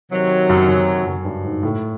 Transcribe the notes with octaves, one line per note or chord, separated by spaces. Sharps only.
C3 D#3 F#3
F#2
F#2
F#2
G2
G#2
A2